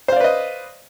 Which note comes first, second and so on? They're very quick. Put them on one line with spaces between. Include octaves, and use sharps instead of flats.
C5 F5 D5 B4 D#5